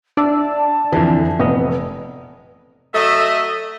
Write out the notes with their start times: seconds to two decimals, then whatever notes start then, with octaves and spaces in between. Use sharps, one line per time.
0.17 D4 D5 E5 A5
0.92 F2 D3 E3
1.40 F1 B3 B4 D#5
2.94 F#3 A3 D#5 E5